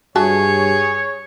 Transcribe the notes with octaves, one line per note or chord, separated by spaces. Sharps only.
G2 F#4 G#4 C#5 E5 A5